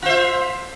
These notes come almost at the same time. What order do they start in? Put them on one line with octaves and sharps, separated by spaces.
F4 C5 E5